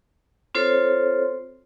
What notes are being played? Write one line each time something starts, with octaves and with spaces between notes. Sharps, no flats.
C4 F4 A4 C5 C#5